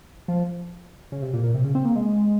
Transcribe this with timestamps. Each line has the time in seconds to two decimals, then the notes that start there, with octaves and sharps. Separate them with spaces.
0.28 F3
1.12 C#3
1.22 C3
1.33 A#2
1.43 A#2
1.54 C3
1.64 C#3
1.75 C4
1.85 A#3
1.96 G#3